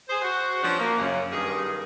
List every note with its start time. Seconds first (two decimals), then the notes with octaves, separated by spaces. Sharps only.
0.08 G#4 C5
0.22 F#4 C5
0.63 F3 G3 B3 C#4 D4
0.78 A#3
0.98 F#2 C#3
1.32 G2 D#3 A#3 G#4